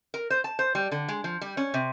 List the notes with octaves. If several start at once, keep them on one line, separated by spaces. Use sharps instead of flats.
A#4
C5
A5
C5
G3
D3
G#3
F3
G3
C#4
C3